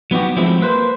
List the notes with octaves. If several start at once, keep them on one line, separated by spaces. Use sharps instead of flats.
F#3 B3 D#4 F#4 G4
F3 F#3 G#3 A3 C4 E4
A#3 B4 C5